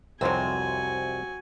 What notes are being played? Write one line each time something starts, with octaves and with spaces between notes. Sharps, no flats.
C2 F2 C3 F#3 C4 F#4 G#5